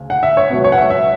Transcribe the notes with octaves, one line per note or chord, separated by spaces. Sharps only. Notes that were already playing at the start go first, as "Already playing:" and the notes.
Already playing: D2 C#3
F#5
E5
C#5
C#2 B2 F#3 B3
C#5
F#5
E5
E5